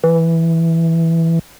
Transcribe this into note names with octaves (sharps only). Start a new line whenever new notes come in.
E3